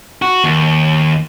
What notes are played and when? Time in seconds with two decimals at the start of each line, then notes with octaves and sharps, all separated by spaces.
0.22 F#4
0.44 D#2